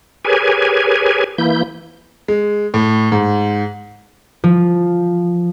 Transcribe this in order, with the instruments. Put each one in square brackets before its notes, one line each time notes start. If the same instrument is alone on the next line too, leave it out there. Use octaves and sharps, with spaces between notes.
[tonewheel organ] G4 G#4 A#4 B4 C#5 G#5
E3 A#3 E4 G6
[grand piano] G#3
A2
G#2
[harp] F3